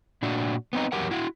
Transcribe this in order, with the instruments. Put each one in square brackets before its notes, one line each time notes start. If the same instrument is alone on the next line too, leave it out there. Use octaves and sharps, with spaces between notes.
[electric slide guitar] A#2 D4 F#4
B3 C4 D#4
E2 F#3 G4 A#4 F#5
E4 F#4 F#5